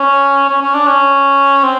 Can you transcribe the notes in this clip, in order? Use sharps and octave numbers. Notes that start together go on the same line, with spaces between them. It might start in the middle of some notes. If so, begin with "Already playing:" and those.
Already playing: C#4
C#4
C#4
D4
C#4
C4